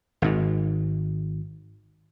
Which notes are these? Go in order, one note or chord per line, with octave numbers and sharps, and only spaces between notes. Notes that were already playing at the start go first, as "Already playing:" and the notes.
G#1 G#2